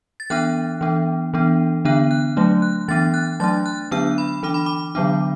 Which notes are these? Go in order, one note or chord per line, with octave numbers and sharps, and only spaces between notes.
A6
E3 B3 D4 F#6
E3 B3 D4
E3 B3 D4
D3 B3 D4 F#6
F#6
F#3 A3 D4
F#6
E3 B3 D4 A6
F#6
F#3 A3 D4 A6
F#6
D3 F#3 B3 D4 E6
B5
E3 D4 D6
B5
D6
D3 F#3 B3 D4